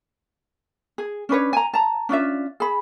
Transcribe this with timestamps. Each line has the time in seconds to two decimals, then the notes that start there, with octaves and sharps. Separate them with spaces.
0.98 G#4
1.29 C#4 D4 B4 C#5
1.53 G#5 A#5
1.74 A5 A#5
2.09 C#4 D4 F4 E5
2.60 G#4 B5